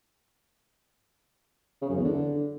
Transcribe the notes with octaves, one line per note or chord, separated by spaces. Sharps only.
C#3
F#2
E2
D3